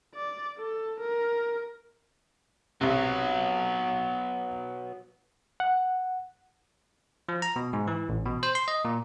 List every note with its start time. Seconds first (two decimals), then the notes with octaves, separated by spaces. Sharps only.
0.15 D5
0.59 A4
1.00 A#4
2.81 B1 C3 F#3 B3
5.60 F#5
7.29 F3
7.42 A#5
7.56 B2
7.73 G#2
7.87 E3
8.09 A1
8.25 B2
8.43 C5
8.55 C6
8.68 D#5
8.85 A#2